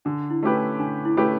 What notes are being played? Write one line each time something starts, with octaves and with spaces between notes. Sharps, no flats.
D3 D4
E4
A3 C#4 G4 B4
D4
D3 D4
E4
A3 C#4 G4 B4